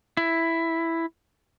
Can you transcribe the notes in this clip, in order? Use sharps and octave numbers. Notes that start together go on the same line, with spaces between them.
E4